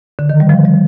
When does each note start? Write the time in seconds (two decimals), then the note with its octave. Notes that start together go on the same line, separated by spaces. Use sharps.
0.19 D3
0.30 D#3
0.40 G3
0.49 F3
0.65 G3